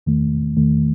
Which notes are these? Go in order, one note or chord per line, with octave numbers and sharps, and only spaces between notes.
E2 D#3 A3
E2 D#3 A3